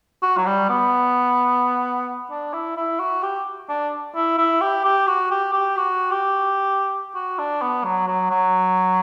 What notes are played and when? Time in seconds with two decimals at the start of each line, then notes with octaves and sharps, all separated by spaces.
0.23 F#4
0.37 F#3
0.46 G3
0.69 B3
2.30 D4
2.53 E4
2.77 E4
3.00 F#4
3.23 G4
3.69 D4
4.15 E4
4.38 E4
4.61 G4
4.84 G4
5.07 F#4
5.31 G4
5.53 G4
5.77 F#4
6.11 G4
7.15 F#4
7.39 D4
7.61 B3
7.84 F#3
8.07 F#3
8.30 F#3